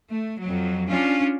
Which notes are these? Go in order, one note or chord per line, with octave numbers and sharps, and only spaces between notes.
A3
F2 F#3
C#4 D4 F4